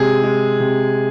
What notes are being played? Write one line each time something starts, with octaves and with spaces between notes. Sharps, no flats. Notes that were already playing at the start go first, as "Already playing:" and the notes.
Already playing: C3 G#3 G#4
G#3
C3